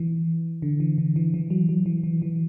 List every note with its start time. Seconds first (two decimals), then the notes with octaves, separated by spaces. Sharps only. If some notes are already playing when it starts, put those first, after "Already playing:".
Already playing: E3
0.62 D3
0.80 E3
0.98 D3
1.16 E3
1.34 E3
1.50 F#3
1.69 F#3
1.86 E3
2.04 E3
2.22 E3